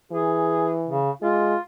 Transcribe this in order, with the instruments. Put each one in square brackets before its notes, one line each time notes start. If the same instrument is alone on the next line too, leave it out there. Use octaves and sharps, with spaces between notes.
[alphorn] E3 [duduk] G#4
[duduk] C#3
[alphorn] G#3 [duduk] F4